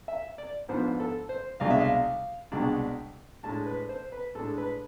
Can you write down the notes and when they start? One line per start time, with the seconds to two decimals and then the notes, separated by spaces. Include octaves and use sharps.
0.08 E5
0.38 D5
0.69 G#2 F3 B3 D4 C5
1.00 A4
1.29 C5
1.60 C2 B2 G#3 D4 F5
1.70 E5
1.80 F5
2.52 C2 B2 G#3 D4
3.43 A2 G#3 D4 A5
3.66 B4
3.89 C5
4.12 B4
4.35 A2 G#3 D4 A4
4.58 B4